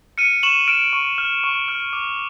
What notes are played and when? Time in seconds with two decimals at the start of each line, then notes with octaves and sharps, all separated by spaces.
0.18 F6 C#7 D#7
0.43 C#6 E7 F#7
0.68 F6 D7 E7
0.93 C#6
1.18 F6
1.44 C#6
1.68 F6
1.93 D6